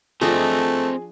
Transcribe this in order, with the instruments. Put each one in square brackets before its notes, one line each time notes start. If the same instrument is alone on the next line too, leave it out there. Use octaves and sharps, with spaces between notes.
[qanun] F3 D4 [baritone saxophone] A3 [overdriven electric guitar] C4 D#5 [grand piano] G#4